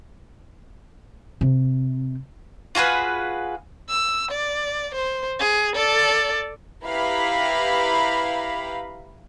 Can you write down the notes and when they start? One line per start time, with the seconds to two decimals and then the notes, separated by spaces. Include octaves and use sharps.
1.41 C3
2.75 F4 F#4 G#4 B4
3.90 E6
4.31 D5
4.95 C5
5.39 G#4
5.76 A4 D5
6.84 E4 G4 B4 F5 A#5 B5